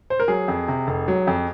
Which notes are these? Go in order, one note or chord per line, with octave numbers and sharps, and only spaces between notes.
C5
A#4
F#3 G#4
F2
C3
F1
F#3
F2